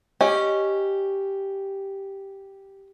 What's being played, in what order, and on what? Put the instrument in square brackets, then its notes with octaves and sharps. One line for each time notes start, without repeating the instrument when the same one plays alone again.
[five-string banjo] C#4 [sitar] G4 [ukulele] D#5